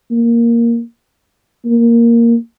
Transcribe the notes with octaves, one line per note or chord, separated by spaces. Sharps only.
A#3
A#3